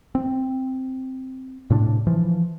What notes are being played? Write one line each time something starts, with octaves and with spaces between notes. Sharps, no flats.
C4
A2 C3 D4
E3 F3